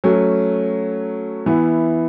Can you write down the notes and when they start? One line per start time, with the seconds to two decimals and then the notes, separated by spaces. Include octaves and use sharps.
0.04 F#3 A3 C#4
1.46 E3 B3 E4